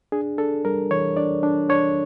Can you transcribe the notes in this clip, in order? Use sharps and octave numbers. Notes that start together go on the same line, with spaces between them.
D4 G#4
D4 A4
G3 A#4
E3 C#5
D4 D5
D4
D4 C#5